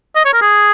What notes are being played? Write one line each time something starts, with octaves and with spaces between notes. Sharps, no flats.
D#5
C#5
A#4
G#4